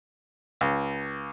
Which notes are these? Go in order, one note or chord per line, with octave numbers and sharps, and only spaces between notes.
C#2